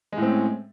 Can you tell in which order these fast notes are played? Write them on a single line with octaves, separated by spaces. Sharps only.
G#3 A2 C4 C#4